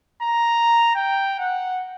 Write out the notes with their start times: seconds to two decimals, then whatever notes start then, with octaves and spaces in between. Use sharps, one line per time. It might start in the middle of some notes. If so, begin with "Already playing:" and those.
0.22 A#5
0.96 G5
1.39 F#5